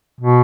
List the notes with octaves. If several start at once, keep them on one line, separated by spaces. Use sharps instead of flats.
B2